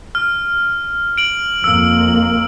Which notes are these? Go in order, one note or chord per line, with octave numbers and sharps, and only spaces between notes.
F6
D7 F#7
F2 A#3 E6